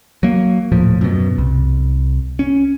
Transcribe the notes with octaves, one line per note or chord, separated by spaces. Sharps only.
F#3 A#3
D#1 A2 F3
F#2 B2
C2
C#4